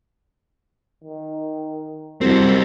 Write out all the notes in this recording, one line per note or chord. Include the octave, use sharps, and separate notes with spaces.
D#3
C2 F#2 C4 F#4 G4 A#4